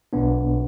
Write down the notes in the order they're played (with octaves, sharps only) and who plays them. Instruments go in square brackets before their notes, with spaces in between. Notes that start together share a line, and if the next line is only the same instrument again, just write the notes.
[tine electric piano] B1 B2 B3 D4